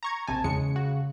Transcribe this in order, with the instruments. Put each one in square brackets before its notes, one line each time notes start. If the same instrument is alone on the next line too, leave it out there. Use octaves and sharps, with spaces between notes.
[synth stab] A#5 C#6 G#6
[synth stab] A#1 C3 G#5 [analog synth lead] A5
[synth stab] E2 G#3 C#7 [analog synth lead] C#3
[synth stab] F#4